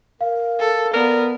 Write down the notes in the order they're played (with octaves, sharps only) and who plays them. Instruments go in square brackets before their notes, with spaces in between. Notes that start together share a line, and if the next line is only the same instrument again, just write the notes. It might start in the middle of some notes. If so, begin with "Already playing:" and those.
[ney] A#4 [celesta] F5
[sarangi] A4
[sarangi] B3 [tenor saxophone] A#4 [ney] D5